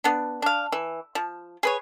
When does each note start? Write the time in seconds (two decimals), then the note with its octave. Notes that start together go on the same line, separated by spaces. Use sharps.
0.04 B3 D4
0.42 D4 F5
0.72 E3
1.15 F3
1.63 G#4 B4 C#5